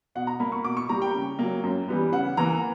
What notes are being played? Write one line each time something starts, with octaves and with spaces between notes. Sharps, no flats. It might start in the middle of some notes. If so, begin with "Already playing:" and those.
B2 F#5
A#5
A#3 B5
C#6
B2 D6
C#6
G3 A#3 A#5
G5
C#3
F#3 A#3
F#2
E3 G3 B3
C#3 F#5
E3 A#3 A#5